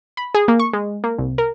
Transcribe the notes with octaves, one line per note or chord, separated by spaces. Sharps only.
B5
G#4
A#3
C#6
G#3
A#3
C2
A#4